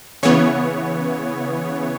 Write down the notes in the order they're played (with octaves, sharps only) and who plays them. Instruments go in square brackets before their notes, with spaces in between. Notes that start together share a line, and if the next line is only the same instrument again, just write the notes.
[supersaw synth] C#3 E3 B3 C#5